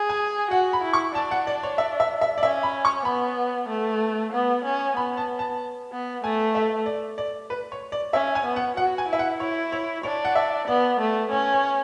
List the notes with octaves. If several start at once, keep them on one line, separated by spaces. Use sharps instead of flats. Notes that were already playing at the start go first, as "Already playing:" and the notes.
Already playing: G#4
G#5
F#4 F#5
B5
E4
C#6
D4 A5
F#5
D5
C#5
E5
E5
E5
D5
C#4 E5
B5
C#6
B3 B5
A3
B3
C#4
B3 B5
A5
A5
B3
A3 G#5
E5
D5
D5
B4
C#5
D5
C#4 E5
G#5
B3
F#5
F#4 F#5
G#5
E4 E5
F#5
E4 C#5
C#5
D4 C#5
F#5
E5
B3 D5
A3
C#4 C#5
C#5